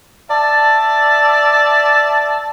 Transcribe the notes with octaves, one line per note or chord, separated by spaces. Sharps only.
D5 E5 A5